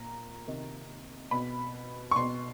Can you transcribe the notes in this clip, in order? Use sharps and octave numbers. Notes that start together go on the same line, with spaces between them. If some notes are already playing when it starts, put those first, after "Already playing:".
Already playing: A#2 A#5
C3 D#3
B2 B5
C#6
B2 C6